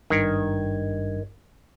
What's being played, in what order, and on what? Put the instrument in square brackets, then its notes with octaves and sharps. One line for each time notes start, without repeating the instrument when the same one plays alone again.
[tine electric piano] G#1 G2 G#6 [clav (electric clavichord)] D#3